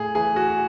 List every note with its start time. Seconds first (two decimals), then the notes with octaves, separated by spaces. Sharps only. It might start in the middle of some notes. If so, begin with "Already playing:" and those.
Already playing: A2 G#4
0.15 E3 G#4
0.36 F#4